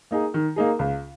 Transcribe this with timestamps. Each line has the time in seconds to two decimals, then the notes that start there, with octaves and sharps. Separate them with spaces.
0.11 A#3 D#4 G#4
0.34 D#3
0.56 A#3 D#4 G#4
0.79 C#2